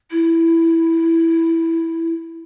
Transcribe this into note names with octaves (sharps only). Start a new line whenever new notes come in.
E4